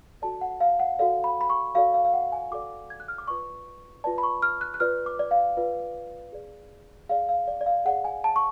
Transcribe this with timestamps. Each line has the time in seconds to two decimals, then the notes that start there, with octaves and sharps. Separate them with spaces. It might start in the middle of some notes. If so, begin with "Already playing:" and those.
0.22 F#4 A4 D5 A5
0.41 F#5
0.61 F5
0.80 F#5
0.99 F#4 A4 D5 F5
1.24 B5
1.41 B5
1.50 C#6
1.75 F#4 A4 D5 F5
1.94 F5
2.05 F5
2.14 F#5
2.32 G#5
2.51 F#4 A4 D5 D6
2.90 G#6
3.00 F#6
3.08 F6
3.18 D6
3.28 F4 B4 D5 C#6
4.04 F4 B4 D5 A5
4.18 B5
4.23 C#6
4.42 F6
4.61 F#6
4.74 F#6
4.80 F4 B4 D5 F6
5.06 D6
5.19 D5
5.31 F5
5.57 F4 B4 D5
6.32 G#4 D5
7.09 G#4 D5 F5
7.29 F5
7.48 D5
7.61 D5
7.66 F5
7.85 G#4 D5 F#5
8.04 G#5
8.24 A5
8.36 C#6